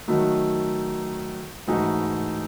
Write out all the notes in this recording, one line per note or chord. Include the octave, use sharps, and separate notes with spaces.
D#3 F#3 A3 D#4 F#4
G#2 E3 A3 D#4 F#4